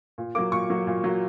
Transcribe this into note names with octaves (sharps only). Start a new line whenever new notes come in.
A#2
F#3 A#3 D6
A#2 C#6
F#3 A#3
A#2
F#3 A#3